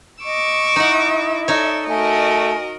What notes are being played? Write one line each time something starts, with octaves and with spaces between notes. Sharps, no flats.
D#5 C#6 D6 E6
D#4 E4 F#5
D#4 A4 C#5 D5 E5
A3 F#4 A#4 D#5 G#5